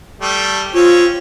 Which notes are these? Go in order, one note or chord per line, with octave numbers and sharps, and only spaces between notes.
G3 A3
C4 C#4 F4